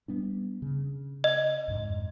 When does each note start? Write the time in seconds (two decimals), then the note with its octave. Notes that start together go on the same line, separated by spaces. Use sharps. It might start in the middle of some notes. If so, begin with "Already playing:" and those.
0.08 G3 B3 D4
0.62 C#3
1.24 D#5
1.68 F2 G#2